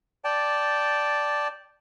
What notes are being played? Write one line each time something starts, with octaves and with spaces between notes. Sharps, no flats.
D5 G5 A5